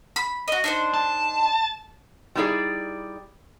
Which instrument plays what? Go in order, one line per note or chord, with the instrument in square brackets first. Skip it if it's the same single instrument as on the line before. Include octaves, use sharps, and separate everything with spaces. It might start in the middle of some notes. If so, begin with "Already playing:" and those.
[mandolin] B5
F#4 D#5
D4 D#4 C5
[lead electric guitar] A5
[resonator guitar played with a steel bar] G3 D#4 E4 G4 G#4 D5